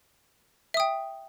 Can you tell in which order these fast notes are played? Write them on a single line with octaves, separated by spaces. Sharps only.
E5 D#6 G5